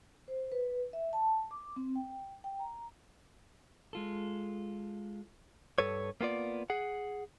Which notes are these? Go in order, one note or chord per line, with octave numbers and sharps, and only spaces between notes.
C5
B4
E5
A5
D6
C4
G5
G5
A#5
G#3 F4 A4
G2 A4 B4 C#5
A#3 B3 F4 D5
G#4 F#5